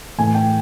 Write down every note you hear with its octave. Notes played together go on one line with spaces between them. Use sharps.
A2 E3 A3 G#5
G5